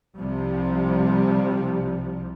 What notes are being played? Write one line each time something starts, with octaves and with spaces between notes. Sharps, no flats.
C2 C3 F3 G3